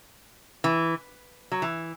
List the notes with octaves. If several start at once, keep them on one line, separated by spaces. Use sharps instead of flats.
E3
F#3
E3